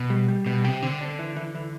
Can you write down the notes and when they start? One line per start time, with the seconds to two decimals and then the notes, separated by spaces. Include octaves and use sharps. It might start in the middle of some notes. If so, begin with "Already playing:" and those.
Already playing: B2
0.10 G3
0.28 G3
0.46 B2 G3
0.64 C3 G4
0.82 D3 C4
1.01 D4
1.19 E3
1.36 E3
1.55 E3